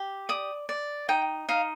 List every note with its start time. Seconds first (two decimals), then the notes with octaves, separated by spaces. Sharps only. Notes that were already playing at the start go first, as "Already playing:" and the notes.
Already playing: G4
0.29 D5 D#6
0.69 D5
1.09 D#4 G5
1.49 D#4 F5